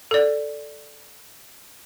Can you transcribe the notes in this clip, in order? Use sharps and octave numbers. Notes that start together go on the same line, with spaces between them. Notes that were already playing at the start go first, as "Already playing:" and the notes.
A4 D5